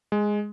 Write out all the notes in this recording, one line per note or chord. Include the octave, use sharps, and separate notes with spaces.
G#3